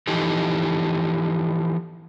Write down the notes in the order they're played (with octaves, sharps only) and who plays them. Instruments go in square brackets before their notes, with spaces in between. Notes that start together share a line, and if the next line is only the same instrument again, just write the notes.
[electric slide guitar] E3 F3 D#4 G4 A4